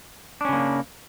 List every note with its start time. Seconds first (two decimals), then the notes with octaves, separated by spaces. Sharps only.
0.41 D4
0.45 C#4
0.49 C#3
0.53 A#3